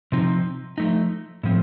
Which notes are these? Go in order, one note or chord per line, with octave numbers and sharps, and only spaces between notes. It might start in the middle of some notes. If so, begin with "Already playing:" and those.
C3 F3 C4 D#4
F3 A3 D#4
A2 F3 C4